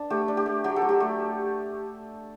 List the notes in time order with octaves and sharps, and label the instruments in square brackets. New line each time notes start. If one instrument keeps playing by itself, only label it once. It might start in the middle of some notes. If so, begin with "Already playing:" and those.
Already playing: [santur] D4
A3 G4
D4
G4
A3
F#3 G4
A4
F#3
G4
A3